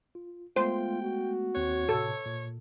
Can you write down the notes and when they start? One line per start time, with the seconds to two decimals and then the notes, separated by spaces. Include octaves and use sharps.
0.15 F4
0.56 G#3 A3 B3 F4 C5 G5
1.02 F#4
1.55 D#2 C4 C#5 F#6
1.89 A2 C3 A4
2.26 A#2